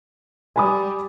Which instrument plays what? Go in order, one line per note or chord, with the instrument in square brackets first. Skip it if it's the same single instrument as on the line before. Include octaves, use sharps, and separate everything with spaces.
[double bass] G3 [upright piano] G#5 B5 D#6